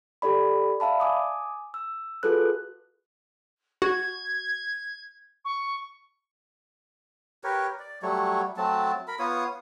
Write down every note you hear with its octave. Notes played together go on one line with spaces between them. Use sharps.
G4 A4 D5 B5
D5 E5 F5 A5 B5
G#5 D6 D#6
E6
F4 F#4 G#4 A4 B4 F#6
F#4 G#6
C#6
G4 A#4 B4 C#5
D5
F#3 G3 A3 C#5
F#3 A3 C4 A5
A#4 B5
B3 F4 C#5 D#6